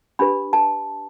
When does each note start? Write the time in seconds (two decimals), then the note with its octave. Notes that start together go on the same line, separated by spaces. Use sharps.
0.19 D4 G4 B4 B5
0.53 A5